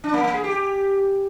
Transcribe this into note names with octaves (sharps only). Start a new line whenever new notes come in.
D4
A#3
A#3
G#4
G4